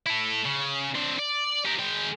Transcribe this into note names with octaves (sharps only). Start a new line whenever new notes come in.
E4 A4
C#3
C4 D4
D5
G4 A#4
G#3 G5